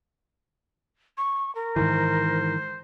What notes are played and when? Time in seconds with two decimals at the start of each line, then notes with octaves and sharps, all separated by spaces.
1.18 C#6
1.55 A#4
1.76 G#2 D#3 E3 C5